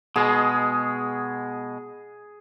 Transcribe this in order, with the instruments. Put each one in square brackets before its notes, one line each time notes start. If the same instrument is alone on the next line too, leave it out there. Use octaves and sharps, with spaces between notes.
[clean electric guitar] B2 G#3 [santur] G#4